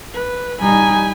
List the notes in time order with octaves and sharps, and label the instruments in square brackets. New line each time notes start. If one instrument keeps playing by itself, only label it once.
[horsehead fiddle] B4
[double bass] G3 D#4 [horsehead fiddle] G#5 B5